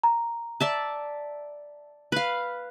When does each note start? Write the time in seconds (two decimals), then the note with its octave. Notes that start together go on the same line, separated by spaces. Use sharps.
0.03 A#5
0.60 D5 E5 A5
2.12 B4 F5